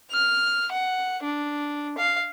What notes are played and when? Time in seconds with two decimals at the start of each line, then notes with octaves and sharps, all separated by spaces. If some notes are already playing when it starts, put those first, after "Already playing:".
0.11 F6
0.72 F#5
1.23 D4
1.98 F5